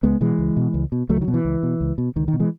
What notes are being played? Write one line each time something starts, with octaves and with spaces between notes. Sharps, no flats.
C#2 G#3 B3
B2 E3 G#3
C#2
B2
C#2
B2
C#2 F#3 A3
E3
D#3 F#3
B2
E3
C#2
B2
C#2
B2
C#2 D#3
D#3
B2
E3 G#3